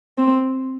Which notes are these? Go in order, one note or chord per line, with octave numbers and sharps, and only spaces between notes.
C4